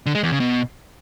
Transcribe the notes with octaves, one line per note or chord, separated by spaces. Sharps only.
D3
G#3
E2
C#3
B2